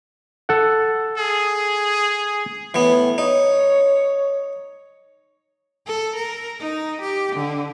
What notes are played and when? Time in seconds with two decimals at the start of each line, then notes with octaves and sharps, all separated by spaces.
0.49 A4 F#5
1.18 G#4
2.74 A2 E3 B3
3.18 D#4 C#5
5.87 A4
6.16 A#4
6.59 D#4
7.02 G4
7.36 D3